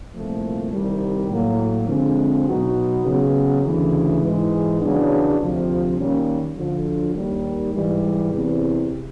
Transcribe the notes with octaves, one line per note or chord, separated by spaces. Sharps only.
C2 A#2 F3 A3
C2 C3 D#3 G3
A2 F#3 A#3
D3 F3 G#3 C4
B2 F#3 B3 D#4 F#4
C#3 F#3 B3
D2 C#3 E3
G#2 E3 G#3
E2 C#3 F#3 B3 D4
D2 C3 F3
D#3 G3 A#3 C#4
D2 D3 F3
D#2 D#3 G3
G#2 E3 G3
E2 C3 E3